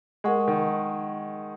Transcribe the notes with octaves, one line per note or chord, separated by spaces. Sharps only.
G#3 A#4 D#5 F#5 C#6
D#3